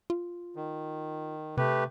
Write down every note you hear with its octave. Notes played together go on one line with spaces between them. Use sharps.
F4
D#3
C3 A3 G4 B4